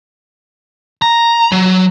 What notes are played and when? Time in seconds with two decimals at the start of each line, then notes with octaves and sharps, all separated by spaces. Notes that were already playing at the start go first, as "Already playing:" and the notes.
1.02 A#5
1.52 F#3